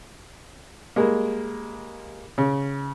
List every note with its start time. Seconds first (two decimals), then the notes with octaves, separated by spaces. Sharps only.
0.96 G3 G#3 A#3
2.38 C#3